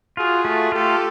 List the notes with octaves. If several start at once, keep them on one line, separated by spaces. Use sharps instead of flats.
F4 F#4 G#4
A3
F4 G4 A4